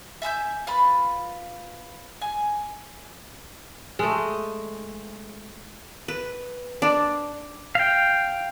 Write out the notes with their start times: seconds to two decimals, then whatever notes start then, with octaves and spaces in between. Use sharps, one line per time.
0.22 E5 G#5 E6 G6
0.67 F4 B4 B5
2.21 G#5
3.99 G#3 A3
6.08 B4
6.82 D4
7.75 F5 G5